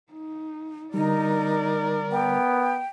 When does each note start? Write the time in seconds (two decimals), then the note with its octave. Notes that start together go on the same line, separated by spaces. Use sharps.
0.12 D#4
0.94 D3 G3 D#4 A#4 D5
2.12 B3 G5